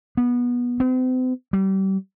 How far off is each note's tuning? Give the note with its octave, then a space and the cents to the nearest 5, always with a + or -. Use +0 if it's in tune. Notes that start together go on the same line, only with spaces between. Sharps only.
B3 -20
C4 -40
G3 -30